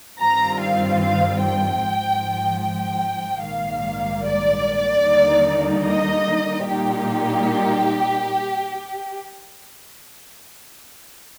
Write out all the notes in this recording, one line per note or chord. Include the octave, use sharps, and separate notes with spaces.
G2 D#3 G3 C4 F4 A#5
F5
F5
G5
G#1 G#2 F3
G5
A#1 G#2 D#3 G3 A#3 F5
D5
D#2 D3 G3 A#3 D#4
D#5
A#2 G3 A#3 D#4 G4